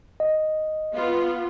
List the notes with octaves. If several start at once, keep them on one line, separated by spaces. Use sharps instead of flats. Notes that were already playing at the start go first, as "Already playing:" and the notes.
D#5
B3 F4